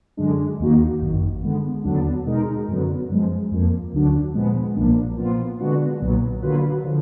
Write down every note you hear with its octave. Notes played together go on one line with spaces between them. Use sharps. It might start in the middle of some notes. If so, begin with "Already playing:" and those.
F#2 D3 G#3 D4
D#2 D#3 A#3 D#4 F#4
G#1 F#2 D#3
D3 G#3 B3
D#2 D3 F#3 B3 D4
B2 G#3 D#4 A#4
F#2 D3 F#3 B3
F#2 F3 G#3
F2 F3 A#3
D2 D3 F#3 D4
A#2 F3 G#3 B3
B1 A#2 F3 A#3 D4
A#2 F3 B3 F4
D3 G#3 B3 D4 F#4
B1 A#2 F#3 B3
D3 F#3 A#3 F4 B4
D3 F3